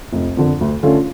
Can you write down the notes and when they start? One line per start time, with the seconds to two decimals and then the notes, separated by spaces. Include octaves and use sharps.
0.13 F1
0.37 F2 D3
0.61 D2
0.83 D3 A3 C#4 F4